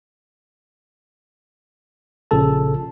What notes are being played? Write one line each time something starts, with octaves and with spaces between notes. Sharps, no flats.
A#1 A#2 C#3 A4 A5